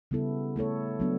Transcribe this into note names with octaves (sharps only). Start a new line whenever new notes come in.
C#3 G3 B3 E4 A4
A3 E4 A4 C#5
F#3 B3 D4